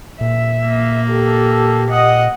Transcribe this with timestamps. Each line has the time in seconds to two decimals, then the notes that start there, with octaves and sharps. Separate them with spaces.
0.21 A#2 E5
0.67 A#3
1.09 G4 A4
1.90 D#5 F#5